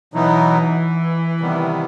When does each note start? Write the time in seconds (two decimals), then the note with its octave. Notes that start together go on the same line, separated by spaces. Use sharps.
0.14 B2 E3 F#3 B3 D#4
1.41 C3 D#3 G3 B3